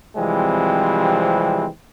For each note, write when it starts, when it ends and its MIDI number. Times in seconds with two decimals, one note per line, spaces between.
0.16 1.66 48
0.16 1.66 52
0.16 1.66 53
0.16 1.66 55
0.16 1.66 56
0.16 1.66 60